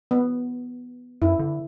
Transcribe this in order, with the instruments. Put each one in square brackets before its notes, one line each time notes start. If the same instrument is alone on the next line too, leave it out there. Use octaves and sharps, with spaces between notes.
[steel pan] B3
[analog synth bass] F#2 [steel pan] E4
[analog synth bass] D3